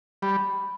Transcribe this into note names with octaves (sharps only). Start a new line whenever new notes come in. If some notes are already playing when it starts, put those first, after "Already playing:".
G3 B5